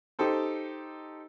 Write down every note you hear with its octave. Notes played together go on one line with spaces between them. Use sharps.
D#4 G4 A4 C5